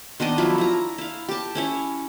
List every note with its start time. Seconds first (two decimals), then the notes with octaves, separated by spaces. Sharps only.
0.20 D#3 B3 D4 D#5
0.38 F3 F#3 E4 F4
0.58 E4 A#5
0.98 E4 F5
1.28 G4 A5
1.55 C#4 E4 C#5